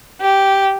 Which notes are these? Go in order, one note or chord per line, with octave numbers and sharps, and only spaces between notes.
G4